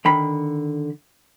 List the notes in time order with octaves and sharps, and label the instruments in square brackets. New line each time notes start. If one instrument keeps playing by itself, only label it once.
[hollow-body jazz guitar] D3 D#3 B5